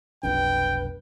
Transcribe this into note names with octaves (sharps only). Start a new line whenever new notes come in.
F1 B1 D4 B4 G5